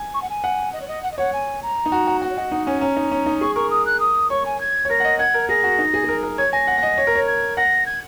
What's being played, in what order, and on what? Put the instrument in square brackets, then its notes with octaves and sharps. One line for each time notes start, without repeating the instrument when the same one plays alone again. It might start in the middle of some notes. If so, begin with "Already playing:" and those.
Already playing: [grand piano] G#5
[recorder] C#6
F#5
G#5
[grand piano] F#5
[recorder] D#5
C#5
D#5
F#5
D#5
[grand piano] C#5 [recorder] F#5
[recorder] G#5
A#5
[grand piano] D#4
F#4
F#4
[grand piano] F#4 [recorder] F#5
[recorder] C#5
[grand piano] F#4 [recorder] D#5
[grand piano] D#4 [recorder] F#5
[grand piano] C#4 [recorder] G#5
[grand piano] C#4 [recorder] A#5
[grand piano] D#4
C#4
D#4
[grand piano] G#4 [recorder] C#6
[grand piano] A#4 [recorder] C#6
[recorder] D#6
F#6
D#6
[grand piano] C#5 [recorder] C#6
[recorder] G#5
G#6
[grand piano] C#5
[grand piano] A#4 [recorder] A#6
[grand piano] F#5
D#5
[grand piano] F#5 [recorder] G#6
[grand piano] A#4
[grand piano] G#4 [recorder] A#6
[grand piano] F#4
D#4
G#4
G#4
A#4
A#4
[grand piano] C#5 [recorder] G#6
[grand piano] G#5 [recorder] A#6
[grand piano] F#5
F#5
D#5
C#5
A#4
C#5
[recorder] G#6
[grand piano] F#5 [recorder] A#6
[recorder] G#6